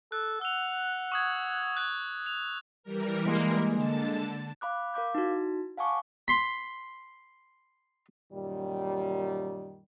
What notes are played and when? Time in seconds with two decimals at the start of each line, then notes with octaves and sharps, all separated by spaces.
0.12 A4 F#6
0.41 F#5 E6 F7
1.12 C#6 D#6 G#6
1.77 F#6 G#6
2.26 F7
2.83 E3 G3 A#4
3.26 G#3 A#3
3.73 D3 A5
4.61 F5 B5 D6 F#6
4.94 A#4 F5 D6 G6
5.15 D#4 E4 F#4
5.78 F5 F#5 G#5 A5 C#6 D6
6.28 B5 C6
8.32 F#2 A#2 D#3 G3